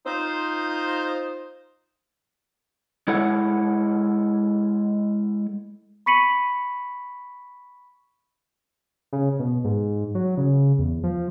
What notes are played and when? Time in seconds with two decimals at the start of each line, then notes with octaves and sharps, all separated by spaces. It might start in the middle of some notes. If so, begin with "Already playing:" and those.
0.05 D#4 F4 C5
3.08 G#3 E4 A4 C#5 F#5
6.06 B5 C#6 B6 C#7 D#7 F#7
9.13 C#3
9.39 B2
9.64 G#2
10.15 F#3
10.37 C#3
10.79 E2
11.04 F3